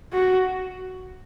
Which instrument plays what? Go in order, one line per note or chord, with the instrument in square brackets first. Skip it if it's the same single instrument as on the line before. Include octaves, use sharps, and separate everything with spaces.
[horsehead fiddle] F#4